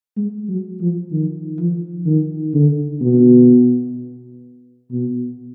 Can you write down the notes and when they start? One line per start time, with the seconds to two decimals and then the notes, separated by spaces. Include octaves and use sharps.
0.17 G#3
0.49 F#3
0.81 F3
1.12 D#3
1.59 F3
2.06 D#3
2.54 D3
3.01 B2
4.91 B2